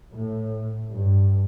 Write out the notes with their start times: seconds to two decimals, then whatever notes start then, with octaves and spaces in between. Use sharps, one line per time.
0.11 A2
0.91 G2